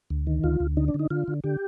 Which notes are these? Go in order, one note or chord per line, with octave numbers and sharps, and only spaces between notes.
D2
D#3
D2 F4
D2
D3 D#4
D4
D3
D#4
D3 F4
D3
D3 G4